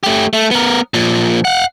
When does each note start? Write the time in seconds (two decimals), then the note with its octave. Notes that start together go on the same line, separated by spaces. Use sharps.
0.04 A3 G4
0.33 A3
0.51 B3 A#4
0.94 A#2 F3
1.45 F5 F#5